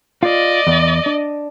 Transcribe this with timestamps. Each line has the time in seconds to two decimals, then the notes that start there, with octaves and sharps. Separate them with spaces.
0.23 F4 D5 D#5
0.67 E2
1.06 D4